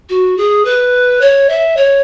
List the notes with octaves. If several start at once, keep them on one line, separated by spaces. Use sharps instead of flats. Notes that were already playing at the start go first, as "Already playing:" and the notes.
F#4
G#4
B4
C#5
E5
C#5